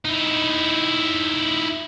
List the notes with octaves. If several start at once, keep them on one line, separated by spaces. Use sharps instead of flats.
D#4 E4